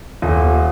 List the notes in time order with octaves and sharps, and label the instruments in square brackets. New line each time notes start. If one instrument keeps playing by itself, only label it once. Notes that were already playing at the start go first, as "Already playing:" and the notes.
[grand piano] D#1